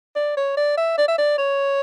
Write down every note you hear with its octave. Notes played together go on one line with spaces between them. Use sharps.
D5
C#5
D5
E5
D5
E5
D5
C#5